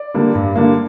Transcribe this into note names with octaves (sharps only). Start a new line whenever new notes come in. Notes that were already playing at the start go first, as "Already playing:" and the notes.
Already playing: D5
D3 G3 A#3
G2
D3 G3 A#3